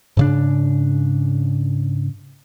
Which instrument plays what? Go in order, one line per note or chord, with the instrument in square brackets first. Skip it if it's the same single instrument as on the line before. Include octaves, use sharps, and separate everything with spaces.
[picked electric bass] G#2 C#3 D4